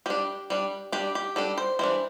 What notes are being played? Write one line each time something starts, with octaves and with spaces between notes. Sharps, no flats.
G3 D4 G4
G3 D4
G3 D4 G4
G4
G3 D4 A4
C5
E3 G3 D4 C5